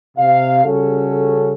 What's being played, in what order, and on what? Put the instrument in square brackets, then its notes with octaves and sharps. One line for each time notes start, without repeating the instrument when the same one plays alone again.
[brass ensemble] C3 F5
C#3 G3 C#4 F#4 A4